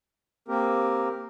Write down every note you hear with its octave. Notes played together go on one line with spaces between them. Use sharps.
A#3 C4 G4 A#4